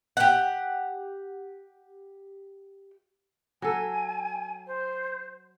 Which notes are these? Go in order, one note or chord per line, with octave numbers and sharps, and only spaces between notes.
G4 F#5
F#3 A4 G#5
C5